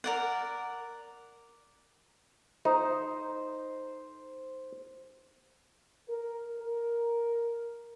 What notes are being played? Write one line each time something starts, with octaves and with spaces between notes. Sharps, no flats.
A#4 D5 F#5
D#4 C5
A#4
A#4